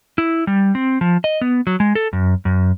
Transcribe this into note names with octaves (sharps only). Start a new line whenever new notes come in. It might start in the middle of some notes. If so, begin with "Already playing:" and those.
E4
G3
C4
F3
D#5
B3
F#3
G#3
A4
F#2
F#2